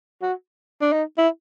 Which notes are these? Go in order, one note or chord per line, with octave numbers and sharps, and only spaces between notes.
F#4
D4
D#4
E4